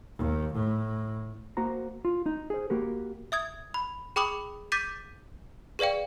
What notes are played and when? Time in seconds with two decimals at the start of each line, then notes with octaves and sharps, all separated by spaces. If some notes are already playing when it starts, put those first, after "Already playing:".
0.17 D#2
0.54 A2
1.57 A#3 F#4 C5 A#5
2.05 F4
2.26 D#4
2.50 G#4 C5
2.70 A#3 F#4 G4 A#4
3.32 E5 D#6 G#6
3.74 B5
4.16 G#4 G5 B5 D6 D#6 F#7
4.72 D6 G6 A6 B6 D#7
5.79 G#4 B4 D5 F5 G5